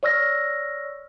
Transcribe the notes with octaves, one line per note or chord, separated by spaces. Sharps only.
C#5 D5 C#6 E6 F6 A#6